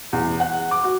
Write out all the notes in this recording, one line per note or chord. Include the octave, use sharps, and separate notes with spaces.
E2
F#5
D6
F#4